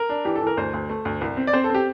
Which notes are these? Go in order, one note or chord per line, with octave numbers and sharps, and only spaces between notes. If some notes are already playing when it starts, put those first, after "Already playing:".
Already playing: A#4
D4
E3 G4
A4
E3
A#4
D2 C5
D2
A3
D2
C2
C4
D5
C4 C5
A4
C4 G4